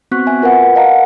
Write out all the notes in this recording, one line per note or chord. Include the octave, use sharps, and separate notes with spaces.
B3 C4 F#4 C#6 F#6 B6
E5 G#5
F4 A#4 B4 F#5
A#4 D#5 F5 F#5 A5 A#5